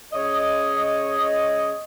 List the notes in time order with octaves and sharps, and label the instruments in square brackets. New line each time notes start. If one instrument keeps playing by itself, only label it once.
[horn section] C#3 C#5 D#5